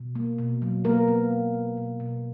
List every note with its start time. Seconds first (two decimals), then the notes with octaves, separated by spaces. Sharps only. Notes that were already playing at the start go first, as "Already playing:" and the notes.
Already playing: B2
0.15 A#3
0.38 B2
0.62 F#3
0.84 A#3 B3 A#4
1.08 B3
1.31 B2
1.54 B2
1.77 B2
2.00 B2